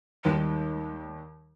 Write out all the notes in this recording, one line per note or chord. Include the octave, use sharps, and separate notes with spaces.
D#2 D#3 G3 G#3